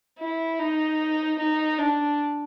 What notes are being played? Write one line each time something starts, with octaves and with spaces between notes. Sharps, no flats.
E4
D#4
D#4
D4